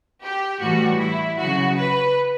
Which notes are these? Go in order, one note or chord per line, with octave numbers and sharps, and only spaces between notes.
G4
A2 E3 G3 F#4
E4
C#3 F#3 F#4
B4